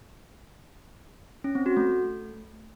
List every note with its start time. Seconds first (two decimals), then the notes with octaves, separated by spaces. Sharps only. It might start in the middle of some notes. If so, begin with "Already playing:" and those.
1.44 C#4
1.55 C4
1.66 F#4
1.77 A3